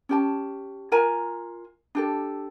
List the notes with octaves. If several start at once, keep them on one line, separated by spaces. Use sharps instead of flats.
C#4 G4 A5
F4 A#4 G#5 A#5
D4 G4 A4